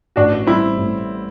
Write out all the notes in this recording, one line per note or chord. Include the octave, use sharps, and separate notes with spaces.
A1 D4 F#4
G3 C4 E4
A2